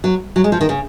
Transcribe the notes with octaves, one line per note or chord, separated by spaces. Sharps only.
F#3
F#3
G#3
F3
D#3
C#3